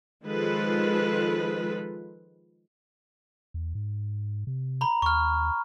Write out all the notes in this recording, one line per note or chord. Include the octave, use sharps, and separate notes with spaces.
D#3 F3 G#3 F4 A4 B4
E2
G#2
C3
A#5 B5
D#2 C#6 F6